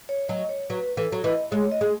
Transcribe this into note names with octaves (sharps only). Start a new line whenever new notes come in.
C#5
F#3 D#5
C#5
F#3 B4
E3 A4
F#3
E3 D#5
G#3 C#5
D#5
G#3